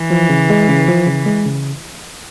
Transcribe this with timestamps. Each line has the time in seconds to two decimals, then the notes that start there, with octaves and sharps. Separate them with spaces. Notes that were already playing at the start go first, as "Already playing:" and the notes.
Already playing: E3
0.10 F3
0.29 C#3
0.50 G#3
0.68 C#3
0.88 F3
1.07 C#3
1.26 G#3
1.45 C#3